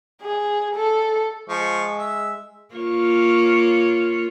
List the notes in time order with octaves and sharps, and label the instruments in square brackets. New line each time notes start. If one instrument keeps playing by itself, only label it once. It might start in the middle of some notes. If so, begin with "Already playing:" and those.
[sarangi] G#4
A4
[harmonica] F3 C#6 [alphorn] G#3
[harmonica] E5
[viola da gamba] A#3 F4 C#5